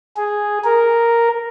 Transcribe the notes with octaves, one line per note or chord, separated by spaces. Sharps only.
G#4
A#4